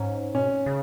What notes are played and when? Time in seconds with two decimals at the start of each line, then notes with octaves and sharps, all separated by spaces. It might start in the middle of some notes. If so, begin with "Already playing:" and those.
Already playing: G#2 C#4
0.34 B2 C#4
0.66 C#3